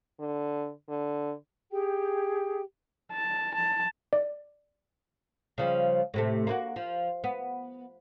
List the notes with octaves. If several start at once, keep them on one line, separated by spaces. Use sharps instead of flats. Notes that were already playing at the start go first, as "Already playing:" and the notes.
D3
D3
G4 G#4 G5
A5
A5
D5
C#3 F3 G3
A2 C3 A3
A#3 C4 F#4
F3
B3